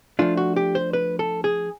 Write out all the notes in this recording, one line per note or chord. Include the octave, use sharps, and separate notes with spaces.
F3 A3 D4 F4
F#4
G4
C5
B4
A4
G#4